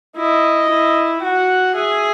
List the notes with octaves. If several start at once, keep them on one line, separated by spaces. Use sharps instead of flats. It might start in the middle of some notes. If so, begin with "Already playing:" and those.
E4 D#5
E4
F#4 F#5
G#4 E5